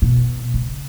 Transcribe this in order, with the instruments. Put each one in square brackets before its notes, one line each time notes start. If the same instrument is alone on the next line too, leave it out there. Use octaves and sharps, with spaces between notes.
[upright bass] B2
C#3